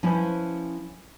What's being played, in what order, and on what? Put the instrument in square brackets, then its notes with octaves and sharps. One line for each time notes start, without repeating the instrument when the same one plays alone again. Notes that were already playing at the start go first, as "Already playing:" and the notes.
[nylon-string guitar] F3 C#4 E4 B4 C5 E5